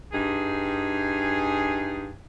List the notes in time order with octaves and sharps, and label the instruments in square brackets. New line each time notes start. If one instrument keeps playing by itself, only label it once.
[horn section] G2 D#4 G#4